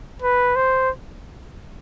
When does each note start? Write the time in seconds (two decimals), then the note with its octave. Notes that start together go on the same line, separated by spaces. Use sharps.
0.22 B4
0.56 C5